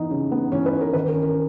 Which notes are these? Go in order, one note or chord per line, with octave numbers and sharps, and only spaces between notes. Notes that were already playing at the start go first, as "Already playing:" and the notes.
Already playing: E3 B3 D#4
C#3
B3
E3 C#4 C#5
B4
D#4
A#4
D#3 B4
A#4
C#4
A#4